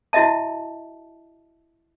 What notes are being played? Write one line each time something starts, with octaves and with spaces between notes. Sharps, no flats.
E4 F#4 D#5 E5 A5